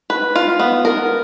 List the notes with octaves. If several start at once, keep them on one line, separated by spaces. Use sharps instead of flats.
B4
F4
B3
A#4